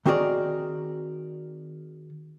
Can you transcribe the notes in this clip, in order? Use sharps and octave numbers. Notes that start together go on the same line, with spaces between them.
D#3 C4 F#4 G#4 A#4 D5